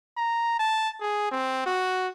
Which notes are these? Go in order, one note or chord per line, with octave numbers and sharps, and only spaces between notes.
A#5
A5
G#4
C4
F#4